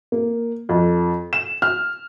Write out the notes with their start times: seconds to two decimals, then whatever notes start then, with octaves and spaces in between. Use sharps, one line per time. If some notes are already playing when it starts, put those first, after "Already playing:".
0.12 A#3
0.69 F2
1.33 E7
1.62 F6